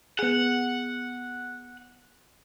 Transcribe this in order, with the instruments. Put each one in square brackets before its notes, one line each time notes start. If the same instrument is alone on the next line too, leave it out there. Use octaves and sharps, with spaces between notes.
[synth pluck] B3 G#4 [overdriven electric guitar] F#5